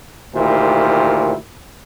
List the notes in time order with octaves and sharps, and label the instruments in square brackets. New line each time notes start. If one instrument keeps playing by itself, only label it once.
[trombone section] D2 A#2 D#3 E4 G4 C5